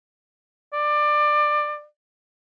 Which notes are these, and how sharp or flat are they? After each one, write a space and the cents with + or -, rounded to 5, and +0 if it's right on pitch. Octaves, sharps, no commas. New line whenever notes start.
D5 +20